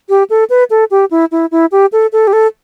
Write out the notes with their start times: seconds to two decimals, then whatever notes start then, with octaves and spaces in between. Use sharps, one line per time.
0.09 G4
0.30 A4
0.50 B4
0.70 A4
0.91 G4
1.11 E4
1.32 E4
1.52 E4
1.72 G4
1.92 A4
2.12 A4
2.27 G4
2.33 A4